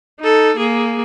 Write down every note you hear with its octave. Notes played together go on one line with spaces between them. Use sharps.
D#4 A4
A#3 G#4